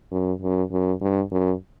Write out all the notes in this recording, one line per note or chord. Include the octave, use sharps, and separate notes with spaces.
F#2
F#2
F#2
G2
F#2